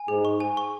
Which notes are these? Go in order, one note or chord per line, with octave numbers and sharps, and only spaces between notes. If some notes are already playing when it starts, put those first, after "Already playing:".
Already playing: G#5
G#2 G#4
C#6
G#5
C#6